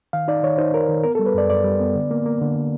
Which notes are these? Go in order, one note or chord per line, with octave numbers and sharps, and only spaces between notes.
D#3 F5
D#4 D5
D#3 C#5
D#4 C5
D#4 A#4
D#3
B3 A#4
A4
G3
B4
F#2 D5
F#2 D5
G3
B3
D3
A#3
A#3
D3
D3